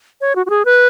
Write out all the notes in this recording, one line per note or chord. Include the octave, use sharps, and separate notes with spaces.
C#5
F#4
F#4
G#4
B4